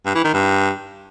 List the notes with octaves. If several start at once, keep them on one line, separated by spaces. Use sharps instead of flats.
G2
E3
D#3
G2